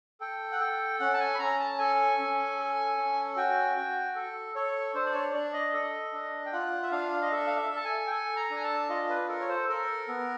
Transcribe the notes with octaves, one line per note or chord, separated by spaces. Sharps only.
A4 G5
F#5
A4 G5
C#4 F#5
A5
G#5
B5
C#4 A#5
A5
A4 G#5
C#4
A4
C#4
F#4 G5
F#4
A4
A4 C#5
D4 C5
D5
C#5
D4 D5
D#5
A4
D4
G5
F4 F#5
E5
D4 F5
D#5
A4 E5
F5
E5
A4
A5
G#5
G5
A4 G#5
A#5
D4 G#5
A5
F4 D#5
B4
A4 A#4
C#5
C5
A4 A#4
B3